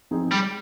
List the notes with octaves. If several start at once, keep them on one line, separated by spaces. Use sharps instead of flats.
F3 C4 D#4 G#4
G3 G#3